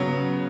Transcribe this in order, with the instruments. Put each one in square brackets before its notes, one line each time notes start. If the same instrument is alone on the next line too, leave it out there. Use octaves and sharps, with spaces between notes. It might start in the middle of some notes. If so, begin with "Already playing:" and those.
Already playing: [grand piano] C#3 F#3 B3